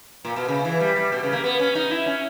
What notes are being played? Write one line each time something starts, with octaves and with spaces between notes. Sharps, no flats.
A#2
B2
C#3
E3
G3
G3
B2
C#3
A#3
B3
C#4
D#4
E4
C#4